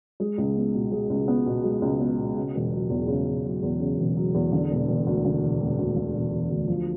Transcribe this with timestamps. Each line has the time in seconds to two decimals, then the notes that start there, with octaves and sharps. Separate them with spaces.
0.20 G#3
0.38 C#2
0.56 B3
0.74 B2
0.92 G#3
1.10 C#2
1.28 B3
1.46 B2
1.64 G#3
1.82 C#2
2.00 B3
2.18 B2
2.36 C#3
2.55 E1
2.72 F#3
2.90 E2
3.08 C#3
3.26 E1
3.44 F#3
3.62 E2
3.80 C#3
3.98 E1
4.16 F#3
4.34 E2
4.52 D3
4.70 E1
4.88 E1
5.07 D2
5.25 D3
5.42 E1
5.60 E1
5.78 D2
5.96 D3
6.14 E1
6.33 E1
6.51 D2
6.68 F3